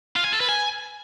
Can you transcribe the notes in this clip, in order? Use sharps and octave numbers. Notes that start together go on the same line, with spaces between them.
F4
G#5
A4
B4
G#5